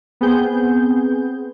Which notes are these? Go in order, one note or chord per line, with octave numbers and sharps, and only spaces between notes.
B3 C4 G#4 G6